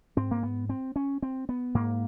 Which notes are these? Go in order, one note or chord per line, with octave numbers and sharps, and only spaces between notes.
G#2 C4
A#3
B3
C4
C#4
C4
B3
G#2 A#3